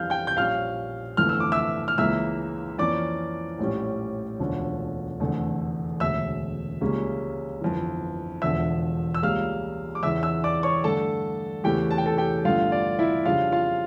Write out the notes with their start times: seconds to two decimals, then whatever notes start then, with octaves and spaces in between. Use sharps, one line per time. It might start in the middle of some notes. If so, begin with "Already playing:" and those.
Already playing: F2 E3 G3 F5 F6 G6
0.10 G5 G6
0.27 G6
0.37 A#1 A#2 G3 C#4 F5 F6
1.17 G1 F2 E3 A3 F6
1.29 E6
1.40 D6
1.52 E5 E6
1.88 F6
1.98 C#2 C#3 E3 A#3 E5 E6
2.78 F2 E3 A#3 C#4 D5 D6
3.59 A#1 A2 G3 C#4
4.39 E1 D2 D3 F3 C#4
5.20 F1 E2 D3 A3
6.00 E1 D2 C#3 E5 E6
6.81 C#2 C#3 G3 A#3 C#4
7.61 G1 F2 E3
8.42 E1 E2 D3 F3 E5 E6
9.14 E6
9.22 C#2 C#3 G3 A#3 F5 F6
9.95 D6
10.03 E2 C#3 E3 E5 E6
10.23 E5 E6
10.44 D5 D6
10.63 C#5 C#6
10.84 G2 D3 A3 A4 A5
11.64 E2 C#3 E3 A3 C#4 G4 G5
11.91 A5
11.98 G5
12.06 A4 A5
12.18 G4 G5
12.45 G1 G2 D3 A3 F4 F5
12.72 D5
12.99 E4 E5
13.25 F2 C#3 G3 D4 F4 F5
13.52 F4 F5